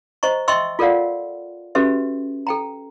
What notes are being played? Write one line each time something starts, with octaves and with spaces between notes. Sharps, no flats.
C5 D#5 A#5 C#6
D#5 E5 G5 C6 C#6 E6
F4 A4 A#4 D5 F5 F#5
C#4 F#4 G4 A4 B4 E5
A4 G5 A#5